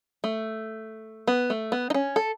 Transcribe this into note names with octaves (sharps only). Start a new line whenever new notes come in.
A3
B3
A3
B3
D#4
C#4
A4